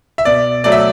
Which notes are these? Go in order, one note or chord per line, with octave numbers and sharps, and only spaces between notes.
E5
B2 D5
F#3 A3 D5
E5